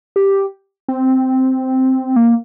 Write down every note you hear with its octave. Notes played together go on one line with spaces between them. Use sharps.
G4
C4
A#3